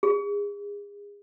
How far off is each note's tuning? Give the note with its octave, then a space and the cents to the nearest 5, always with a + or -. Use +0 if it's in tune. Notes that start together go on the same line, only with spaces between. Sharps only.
G#4 -30